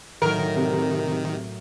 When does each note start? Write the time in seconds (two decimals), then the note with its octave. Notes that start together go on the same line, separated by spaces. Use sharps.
0.22 A2 D#3 F#3 A#4
0.56 C3